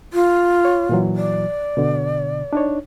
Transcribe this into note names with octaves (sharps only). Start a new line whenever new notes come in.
F4
C#5
A#2 E3 F#3
D5
B2 D3
D4 D#4 C#5